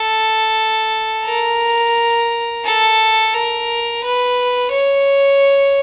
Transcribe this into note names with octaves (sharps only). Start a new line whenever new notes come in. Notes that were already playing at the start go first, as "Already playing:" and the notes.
Already playing: A4
A#4
A4
A#4
B4
C#5